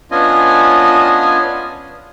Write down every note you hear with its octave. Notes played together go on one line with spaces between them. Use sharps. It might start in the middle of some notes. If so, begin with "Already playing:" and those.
B3 C#4 D4 F4 D#5 G#5